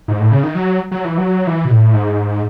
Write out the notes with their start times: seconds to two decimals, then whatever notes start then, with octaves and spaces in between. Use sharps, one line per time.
0.08 G#2
0.20 A2
0.32 C#3
0.43 D#3
0.55 F#3
0.92 F#3
1.05 E3
1.18 F#3
1.47 E3
1.65 B2
1.70 A2
1.94 G#2